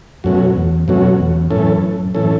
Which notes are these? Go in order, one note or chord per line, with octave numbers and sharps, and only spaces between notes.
F#2 B2 F#3 A3 C#4 F#4
E2
F#2 B2 F#3 A3 C#4 F#4
E2
F#2 A2 E3 C#4 A4
A2 E3 C#4 A4